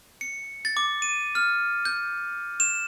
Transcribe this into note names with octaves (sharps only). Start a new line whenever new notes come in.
C#7
A6
D6
D#7
F6
G6
E7